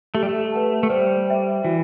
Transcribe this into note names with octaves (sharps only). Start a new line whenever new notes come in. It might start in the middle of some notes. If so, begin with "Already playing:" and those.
A3 G4
G3
A3
B4 F#5 A5
A3
G3 C5
E5 G5
E3 F#4